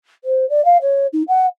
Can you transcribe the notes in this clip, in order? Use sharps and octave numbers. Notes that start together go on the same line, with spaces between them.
C5
D5
F5
C#5
D#4
F#5